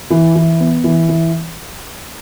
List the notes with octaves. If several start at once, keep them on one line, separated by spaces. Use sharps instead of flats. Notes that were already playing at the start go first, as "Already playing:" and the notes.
E3
E3
B3
E3
E3